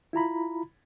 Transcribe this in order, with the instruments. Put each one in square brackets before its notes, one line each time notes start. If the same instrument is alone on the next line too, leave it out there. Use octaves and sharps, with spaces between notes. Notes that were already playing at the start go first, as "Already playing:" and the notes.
[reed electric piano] E4 F4 A#5 B5